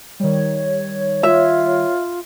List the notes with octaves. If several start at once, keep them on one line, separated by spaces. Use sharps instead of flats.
D#3 G3 C#5
F4 E5